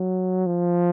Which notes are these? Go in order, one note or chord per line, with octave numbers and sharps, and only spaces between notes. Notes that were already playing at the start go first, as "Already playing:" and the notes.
Already playing: F#3
F3